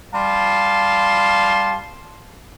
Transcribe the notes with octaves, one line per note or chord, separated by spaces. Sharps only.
G3 F5 A5 C6